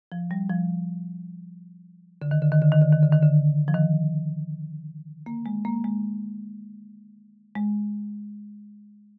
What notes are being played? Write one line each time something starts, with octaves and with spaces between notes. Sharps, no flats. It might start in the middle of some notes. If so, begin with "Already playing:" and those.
F3
G3
F3
D3
D#3
D3
D#3
D3
D#3
D3
D#3
D3
D#3
D3
F3
D#3
A#3
G#3
A#3
G#3
G#3